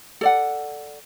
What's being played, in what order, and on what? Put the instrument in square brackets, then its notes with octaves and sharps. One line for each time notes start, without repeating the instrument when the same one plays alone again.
[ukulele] A4 D5 F#5